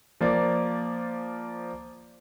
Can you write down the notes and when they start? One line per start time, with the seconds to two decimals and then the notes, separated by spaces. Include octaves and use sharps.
0.21 F3 A#3 D5